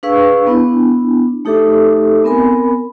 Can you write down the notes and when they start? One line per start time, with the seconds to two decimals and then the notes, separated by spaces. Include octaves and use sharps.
0.03 D4 G#4 B4 F5 C#6 E6
0.47 B3 D4 E4
1.45 A3 D#4 G4 A4 E5 D6
2.24 B3 C4 A#4 G#5 B5